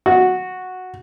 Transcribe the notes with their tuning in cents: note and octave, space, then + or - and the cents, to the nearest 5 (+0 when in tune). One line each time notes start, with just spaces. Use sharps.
F#4 -5